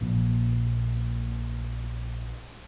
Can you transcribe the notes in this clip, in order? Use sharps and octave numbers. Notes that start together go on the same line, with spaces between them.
A#1 A#2 F3